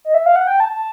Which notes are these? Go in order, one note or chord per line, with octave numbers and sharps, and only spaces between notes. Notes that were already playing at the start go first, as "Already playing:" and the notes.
D#5
E5
F5
F#5
G5
A5
A5